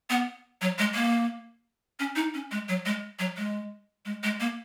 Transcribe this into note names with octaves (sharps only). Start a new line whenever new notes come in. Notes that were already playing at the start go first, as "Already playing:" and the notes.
B3
F#3
G#3
A#3
C#4
D#4
C#4
G#3
F#3
G#3
F#3
G#3
G#3
G#3
A#3